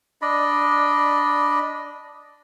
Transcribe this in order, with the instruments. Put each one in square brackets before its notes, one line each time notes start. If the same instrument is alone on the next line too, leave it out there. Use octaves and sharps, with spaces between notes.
[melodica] D4 D5 D#5 B5